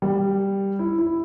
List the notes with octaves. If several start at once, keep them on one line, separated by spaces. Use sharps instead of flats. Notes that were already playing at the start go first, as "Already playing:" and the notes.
G3
E4
E4